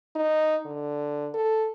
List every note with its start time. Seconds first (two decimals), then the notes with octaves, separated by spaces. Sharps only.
0.15 D#4
0.65 D3
1.34 A4